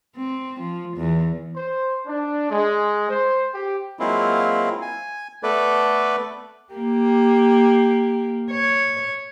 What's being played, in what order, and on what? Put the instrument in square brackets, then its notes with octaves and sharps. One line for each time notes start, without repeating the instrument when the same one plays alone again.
[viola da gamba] C4
F3
E2
[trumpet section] C5
D4
G#3
C5
G4
[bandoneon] F#3 G#3 A#3 C4 E4 F4
G#5
A3 B3 A4 B4 D5
[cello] A#3 G4
C#5